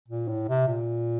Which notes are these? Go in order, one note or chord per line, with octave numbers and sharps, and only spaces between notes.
A#2
A2
C3
A#2